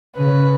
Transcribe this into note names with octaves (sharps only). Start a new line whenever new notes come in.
C#3 B4